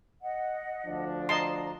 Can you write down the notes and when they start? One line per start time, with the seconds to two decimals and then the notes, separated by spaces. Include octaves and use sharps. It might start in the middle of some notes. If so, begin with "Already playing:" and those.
0.22 D#5 F#5
0.86 D2 F3 D4
1.29 D#5 A5 A#5 C6